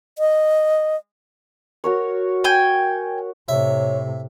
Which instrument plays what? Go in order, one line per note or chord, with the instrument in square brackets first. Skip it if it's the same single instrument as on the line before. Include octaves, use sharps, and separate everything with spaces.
[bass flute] D#5
[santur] F#4 A#4 C#5
[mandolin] G5 G#5
[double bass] A2 C3 [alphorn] C#5 [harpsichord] E5